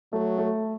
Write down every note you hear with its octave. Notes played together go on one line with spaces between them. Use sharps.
F#3 A3
A3